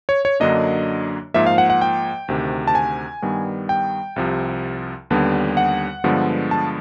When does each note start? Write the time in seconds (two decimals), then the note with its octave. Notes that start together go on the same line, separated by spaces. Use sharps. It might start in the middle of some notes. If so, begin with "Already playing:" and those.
0.09 C#5
0.25 C#5
0.40 F#2 D3 F#3 A#3 D4 D#5
1.34 G#2 F3 A#3 E5
1.46 F5
1.58 F#5
1.70 F#5
1.81 G5
2.28 D2 C3 D#3
2.67 A5
2.75 G#5
3.22 G2 D#3 G3 B3
3.69 G5
4.16 C2 C3 F3
5.10 D#2 D3 G3 B3
5.57 F#5
6.04 G2 D3 F3 G#3 B3
6.51 A5